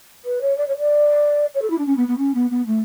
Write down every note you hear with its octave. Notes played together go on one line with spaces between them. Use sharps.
B4
C#5
D5
C#5
D5
C#5
A4
E4
D4
C#4
B3
B3
C#4
B3
B3
A3